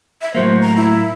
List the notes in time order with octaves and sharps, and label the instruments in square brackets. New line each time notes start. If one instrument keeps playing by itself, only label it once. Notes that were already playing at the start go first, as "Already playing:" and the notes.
[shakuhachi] E5
[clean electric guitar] A2 F#3 A#3 [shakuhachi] C5
[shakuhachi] A#5
E4